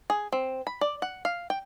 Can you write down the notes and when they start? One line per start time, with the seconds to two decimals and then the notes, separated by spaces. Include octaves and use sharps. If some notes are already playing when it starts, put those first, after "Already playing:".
0.10 G#4
0.32 C4
0.67 B5
0.81 D5
1.02 F#5
1.25 F5
1.50 G5